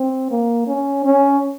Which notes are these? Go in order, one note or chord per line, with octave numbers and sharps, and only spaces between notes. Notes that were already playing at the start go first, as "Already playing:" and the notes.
Already playing: C4
A#3
C#4
C#4